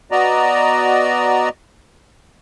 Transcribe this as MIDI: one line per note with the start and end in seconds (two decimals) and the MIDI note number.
0.11 1.49 59
0.11 1.49 66
0.11 1.49 74
0.11 1.49 75
0.11 1.49 82